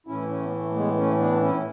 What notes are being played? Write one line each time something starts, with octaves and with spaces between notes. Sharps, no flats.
A2 E3 C#4 E4
A3 C#4
B3
A3
G#3 B3
A3 C#4
B3 D4
C#4 E4